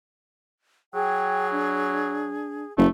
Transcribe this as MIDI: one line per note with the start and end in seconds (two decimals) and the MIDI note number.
0.94 2.41 54
0.94 2.72 68
0.94 1.47 79
1.52 2.64 62
2.78 2.87 30
2.78 2.88 57